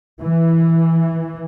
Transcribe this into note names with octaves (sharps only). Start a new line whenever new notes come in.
E3